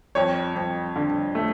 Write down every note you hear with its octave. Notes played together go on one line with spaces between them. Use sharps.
F2 C#5
F2
D3
A3